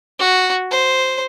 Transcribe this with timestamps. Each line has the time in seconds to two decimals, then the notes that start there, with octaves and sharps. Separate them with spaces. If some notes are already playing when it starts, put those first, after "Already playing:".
0.19 F#4
0.71 C5